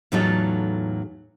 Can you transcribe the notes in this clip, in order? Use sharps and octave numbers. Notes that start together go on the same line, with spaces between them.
E2 A2 F#3 D#4 F4 A4